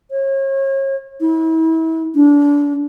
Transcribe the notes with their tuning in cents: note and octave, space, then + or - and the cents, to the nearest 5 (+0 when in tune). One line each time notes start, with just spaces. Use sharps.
C#5 -35
E4 -35
D4 -25